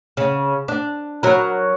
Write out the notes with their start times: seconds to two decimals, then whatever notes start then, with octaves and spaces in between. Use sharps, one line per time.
0.17 C#3
0.68 D4
1.23 F#3 A#4